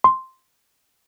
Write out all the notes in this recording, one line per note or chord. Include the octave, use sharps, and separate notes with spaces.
C6